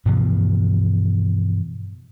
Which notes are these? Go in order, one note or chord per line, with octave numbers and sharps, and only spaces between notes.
G2 B2 E3 F3